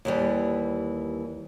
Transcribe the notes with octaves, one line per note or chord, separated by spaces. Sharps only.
D#2 E3 G3